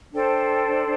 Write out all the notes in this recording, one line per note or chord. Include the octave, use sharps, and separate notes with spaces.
D4 A4 C5 G5